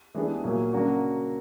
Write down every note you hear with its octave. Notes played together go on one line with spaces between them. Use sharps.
E3 G#3 B3 D4 G4
A#2 F#3 A#3
C#3 F#3 A#3 D4 F#4